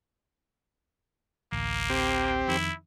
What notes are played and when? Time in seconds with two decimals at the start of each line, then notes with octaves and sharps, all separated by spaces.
1.52 A1 D2 A#3
1.90 C4 G4
2.48 F2 D#3 E4